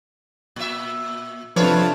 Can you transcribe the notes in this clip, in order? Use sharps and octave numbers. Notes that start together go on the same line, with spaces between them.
A#2 E5
C3 F3 A3 D4 B4 C#5